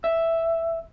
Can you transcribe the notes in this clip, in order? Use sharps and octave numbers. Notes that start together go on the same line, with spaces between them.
E5